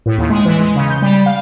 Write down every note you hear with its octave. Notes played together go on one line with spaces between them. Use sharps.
A2
D#2
G#3
E3
G#3
C#3
G6
G3
F5